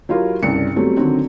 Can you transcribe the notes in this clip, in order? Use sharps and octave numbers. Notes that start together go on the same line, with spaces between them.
F#3 E4 F4 G4 A#4
C2 G2 C#3 C#7
F#3 G3 A3 B3 C4
D3 D#3 F#3 C4 F#4